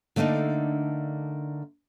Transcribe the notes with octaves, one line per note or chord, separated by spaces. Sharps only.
D3 A3 A#3 D4 D#4